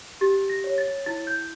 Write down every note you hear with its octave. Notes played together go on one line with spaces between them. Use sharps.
G4 A6
A#6
C#5
A6
E4 A6
G6